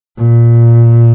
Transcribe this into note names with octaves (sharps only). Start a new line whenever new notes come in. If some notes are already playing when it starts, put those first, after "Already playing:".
A#2